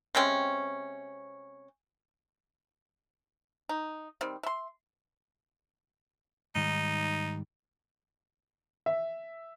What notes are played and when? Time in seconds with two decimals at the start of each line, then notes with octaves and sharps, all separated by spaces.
0.15 C3 G#3 C4 C#4
3.69 D#4
4.21 D#3 G3 C4
4.43 E5 C6
6.55 G#2 D#3 G3 D#4
8.86 E5